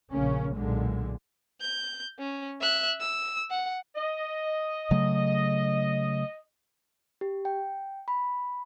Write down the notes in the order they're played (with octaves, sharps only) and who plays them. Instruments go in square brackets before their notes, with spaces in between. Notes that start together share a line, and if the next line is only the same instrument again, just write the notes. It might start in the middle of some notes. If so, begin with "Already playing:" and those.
[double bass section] A#1 C#3 A#3 C#4
B1 A#2 D3 G#3
[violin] G6
C#4
E5 F#6
E6
F#5
[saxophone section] D#5
[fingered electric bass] C#3 F#3 A3
[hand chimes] G4
G5
B5